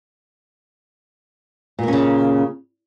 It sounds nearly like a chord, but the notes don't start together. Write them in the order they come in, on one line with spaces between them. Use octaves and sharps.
A#2 A#3 C#4 C#3